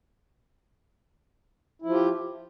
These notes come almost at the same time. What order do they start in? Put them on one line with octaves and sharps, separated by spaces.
E4 F3 F4 G4